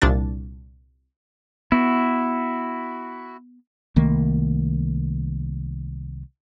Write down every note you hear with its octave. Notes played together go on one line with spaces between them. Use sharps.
C2 A#2 D4 A6
B3 E4 F#4
C2 D#3 A3 A#3